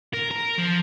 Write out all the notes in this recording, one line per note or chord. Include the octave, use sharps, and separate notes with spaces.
A#4
A#4
F3